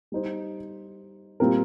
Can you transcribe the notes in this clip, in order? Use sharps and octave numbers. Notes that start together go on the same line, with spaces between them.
G3 D#4 C5
A#2 G3 C4 F4 A#4